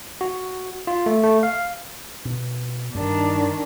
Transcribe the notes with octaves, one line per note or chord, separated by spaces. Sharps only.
F#4
F4
A3
A3
F5
B2
G2 D#3 D4